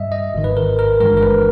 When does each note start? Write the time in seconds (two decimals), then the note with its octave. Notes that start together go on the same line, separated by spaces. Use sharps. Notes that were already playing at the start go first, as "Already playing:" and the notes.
Already playing: G2 G3 D#5 E5
0.12 D#5
0.34 G#1 G#2 D#3
0.44 B4
0.57 A#4
0.79 A#4
1.00 G1 G2 E3 G#3 A#4
1.17 A#4
1.23 B4